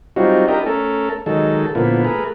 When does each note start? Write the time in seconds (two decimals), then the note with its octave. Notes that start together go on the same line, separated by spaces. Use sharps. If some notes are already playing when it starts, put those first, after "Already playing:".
0.16 F#3 G3 C4 D#4 F4 F#4
0.48 D4 E4 G4 A#4 D#5
0.66 A3 C#4 A4 A#4
1.26 D#3 F#3 G#3 A4
1.75 A#2 D3 F3 A#3 B3 E4
2.04 A3 G#4 A#4 B4